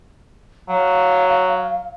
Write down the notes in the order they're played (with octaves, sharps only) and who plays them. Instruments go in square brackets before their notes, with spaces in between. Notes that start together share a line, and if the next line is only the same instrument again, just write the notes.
[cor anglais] F#3 [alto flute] F5